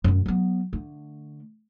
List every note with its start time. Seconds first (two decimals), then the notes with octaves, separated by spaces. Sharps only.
0.04 F#2 D3
0.26 F#3 B3
0.73 D3 A3